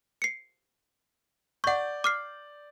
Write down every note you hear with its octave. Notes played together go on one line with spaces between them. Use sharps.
C7 C#7
D5 F#5 C#6 G6
D6 F6 C7